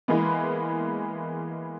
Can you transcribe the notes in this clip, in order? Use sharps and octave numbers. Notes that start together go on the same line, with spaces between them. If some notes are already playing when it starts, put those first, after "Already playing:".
E3 G#3 A#3 B3